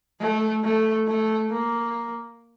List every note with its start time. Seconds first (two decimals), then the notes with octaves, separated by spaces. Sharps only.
0.20 A3
0.64 A3
1.07 A3
1.50 A#3